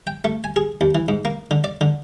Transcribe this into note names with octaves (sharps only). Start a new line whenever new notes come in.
G5
A3
G#5
G#4
D#2
E3
G#2
A#3
D3
D5
D3